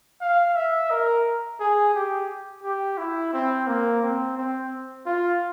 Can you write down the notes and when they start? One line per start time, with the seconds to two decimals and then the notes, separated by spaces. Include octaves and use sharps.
0.22 F5
0.56 E5
0.91 A#4
1.60 G#4
1.94 G4
2.64 G4
2.98 E4
3.33 C4
3.67 A#3
4.02 C4
4.37 C4
5.06 F4